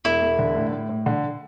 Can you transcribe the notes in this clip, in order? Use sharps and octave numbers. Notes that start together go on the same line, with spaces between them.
E1 E4
E1
D3
A2
A2
A2
D3